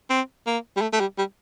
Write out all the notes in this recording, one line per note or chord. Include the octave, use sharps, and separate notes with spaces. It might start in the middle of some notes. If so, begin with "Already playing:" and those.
C4
A#3
G3
A3
A3
G3
G3